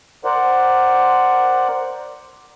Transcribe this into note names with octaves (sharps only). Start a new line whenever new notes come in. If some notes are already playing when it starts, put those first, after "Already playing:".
A#4 C5 D5 F#5